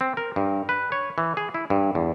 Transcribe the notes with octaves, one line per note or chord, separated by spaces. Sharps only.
C4
A#4
G2
B4
C#5
E3
G#4
E4
G2
E2